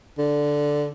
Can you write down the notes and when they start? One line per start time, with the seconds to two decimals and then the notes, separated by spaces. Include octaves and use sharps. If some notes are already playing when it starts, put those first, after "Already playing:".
0.18 D3